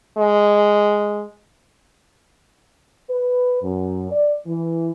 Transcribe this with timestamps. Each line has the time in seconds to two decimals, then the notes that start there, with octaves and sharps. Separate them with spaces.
0.17 G#3
3.09 B4
3.62 F#2
4.11 D5
4.46 E3